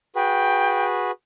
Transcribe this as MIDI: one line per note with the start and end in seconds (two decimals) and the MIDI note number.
0.15 1.11 66
0.15 1.11 68
0.15 1.11 71
0.15 0.86 79